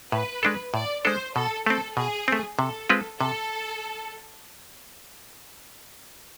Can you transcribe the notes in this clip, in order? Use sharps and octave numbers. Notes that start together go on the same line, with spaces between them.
A2 B4
G#3 D4 A4
A2 D5
G#3 D4 A4 C5
B2 A4
A3 C4 A4
B2 G#4
A3 C4
C3 A4
G#3 C4 F4 B4
C3 A4